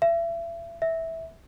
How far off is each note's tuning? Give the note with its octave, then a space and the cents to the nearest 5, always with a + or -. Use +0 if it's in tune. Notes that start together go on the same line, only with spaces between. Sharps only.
E5 +35
E5 -10